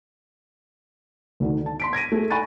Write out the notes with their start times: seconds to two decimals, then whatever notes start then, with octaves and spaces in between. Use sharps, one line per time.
1.40 D2 D3 D#3
1.66 A5
1.80 C6 B6 D7
1.93 G#6 A#6 D7 D#7
2.12 A3 G#4
2.30 G#5 B5 C#6 F#6 A6 D#7